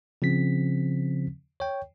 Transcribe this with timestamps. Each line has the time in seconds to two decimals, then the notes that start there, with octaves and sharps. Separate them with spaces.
0.22 C#3 F3 C4 B6
1.60 C#5 G5